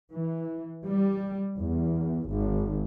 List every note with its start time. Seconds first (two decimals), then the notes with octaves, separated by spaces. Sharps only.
0.13 E3
0.86 G3
1.59 E2
2.29 G#1